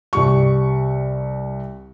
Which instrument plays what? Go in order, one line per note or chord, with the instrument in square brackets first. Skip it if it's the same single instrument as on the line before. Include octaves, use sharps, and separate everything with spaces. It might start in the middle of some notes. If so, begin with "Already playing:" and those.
[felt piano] C2 G3 C#6